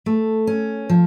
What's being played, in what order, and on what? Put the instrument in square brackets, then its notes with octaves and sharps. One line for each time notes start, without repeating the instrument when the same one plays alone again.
[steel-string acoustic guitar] A3
C#4
F3